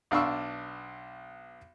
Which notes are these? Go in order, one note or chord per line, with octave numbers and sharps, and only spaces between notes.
B1 D4 F5 B5 C#6 E6